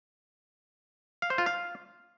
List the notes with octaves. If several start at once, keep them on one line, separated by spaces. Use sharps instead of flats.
F5
C5
F4
F5